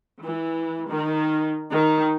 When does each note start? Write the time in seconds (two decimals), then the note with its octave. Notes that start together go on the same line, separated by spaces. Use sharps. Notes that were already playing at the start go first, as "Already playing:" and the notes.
0.23 E3
0.89 D#3
1.71 D#3